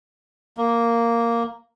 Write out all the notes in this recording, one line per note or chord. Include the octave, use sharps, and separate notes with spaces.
A#3